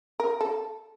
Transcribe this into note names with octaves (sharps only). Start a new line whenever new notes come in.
A#4
A4